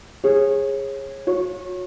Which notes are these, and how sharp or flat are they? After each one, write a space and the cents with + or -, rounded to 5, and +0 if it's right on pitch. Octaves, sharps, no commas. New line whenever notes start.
G#4 -15 C#5 -30
F#4 -35 C#5 +0